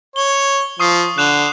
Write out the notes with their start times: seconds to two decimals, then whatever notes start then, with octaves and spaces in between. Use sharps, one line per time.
0.16 C#5 G7
0.80 F3 C#6 D#6 C7
1.18 D3 F#6 E7 F7